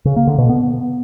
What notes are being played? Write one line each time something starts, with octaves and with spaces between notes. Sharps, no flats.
C#3
A#3
D3
B2
B3